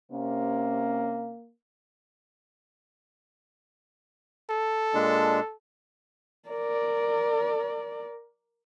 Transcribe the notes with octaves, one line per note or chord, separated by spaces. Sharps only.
C3 A#3 C#4
A4
A#2 G#3 D4
A#4 D5